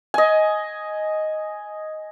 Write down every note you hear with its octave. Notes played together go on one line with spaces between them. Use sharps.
D#5 G#5